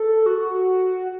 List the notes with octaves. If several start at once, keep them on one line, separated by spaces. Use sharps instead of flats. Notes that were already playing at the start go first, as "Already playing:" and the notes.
Already playing: A4
F#4